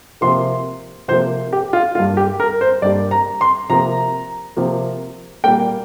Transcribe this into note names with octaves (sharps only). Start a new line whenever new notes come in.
C3 F3 A#3 C6
C3 F3 A#3 C5
G4
F4
G2 G3 A#3 F4
G4
A#4
C5
G2 G3 A#3 D5
A#5
C6
C3 F3 A#3 A#5
C3 F3 A#3
A#2 G3 A#3 G5